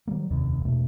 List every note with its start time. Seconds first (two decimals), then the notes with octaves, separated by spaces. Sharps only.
0.08 D#3 F#3 G3 A#3
0.31 F1 D#2 C3
0.65 E1 B2 A3 D4